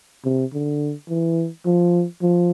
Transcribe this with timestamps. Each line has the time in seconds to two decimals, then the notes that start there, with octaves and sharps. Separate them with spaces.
0.25 C3
0.53 D3
1.09 E3
1.66 F3
2.22 F3